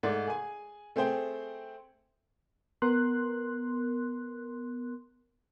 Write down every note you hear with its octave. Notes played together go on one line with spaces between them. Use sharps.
G#2 A3 D5
G#4 G#5
A3 C4 G#4 C5 G5
B3 A#4 C6 F#6